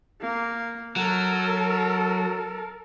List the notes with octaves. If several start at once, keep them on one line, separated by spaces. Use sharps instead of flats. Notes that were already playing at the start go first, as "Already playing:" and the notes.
A#3
F#3 A4 A#4